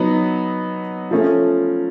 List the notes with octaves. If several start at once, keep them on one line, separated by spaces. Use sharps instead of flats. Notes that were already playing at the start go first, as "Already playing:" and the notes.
Already playing: F#3 B3 D#4
F3 A3 C#4